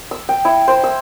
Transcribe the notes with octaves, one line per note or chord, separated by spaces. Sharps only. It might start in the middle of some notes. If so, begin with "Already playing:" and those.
E6
G5
E4
C5
E6